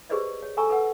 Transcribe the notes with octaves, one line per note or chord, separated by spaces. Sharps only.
G4 G#4 B4 C5 D5 D#5
C#5
A4 G5 G#5 A#5 C#6 E6
A4 B4 F#5